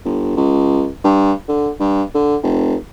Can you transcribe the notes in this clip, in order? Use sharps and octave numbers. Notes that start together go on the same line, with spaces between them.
G1
C#2
G2
D3
G2
D3
F1